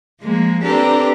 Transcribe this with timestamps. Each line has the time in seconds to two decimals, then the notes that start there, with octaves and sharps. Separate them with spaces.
0.20 F3 G#3 A#3
0.64 C4 D4 G4 A4 B4 A#5